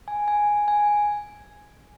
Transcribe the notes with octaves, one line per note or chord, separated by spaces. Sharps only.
G#5
G#5
G#5